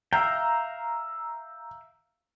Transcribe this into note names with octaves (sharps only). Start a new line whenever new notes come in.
E5 F5 G5 A#5